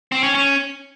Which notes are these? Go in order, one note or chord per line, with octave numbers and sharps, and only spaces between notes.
C4
C#4
C#4